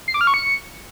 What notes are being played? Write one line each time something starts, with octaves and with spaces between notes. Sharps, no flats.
C7
D6
F6
C#6
C#7